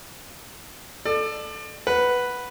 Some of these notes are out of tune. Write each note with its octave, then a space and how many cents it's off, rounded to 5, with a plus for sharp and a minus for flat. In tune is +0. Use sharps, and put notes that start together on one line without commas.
A4 +0 D5 +30
B4 +0 F#5 +0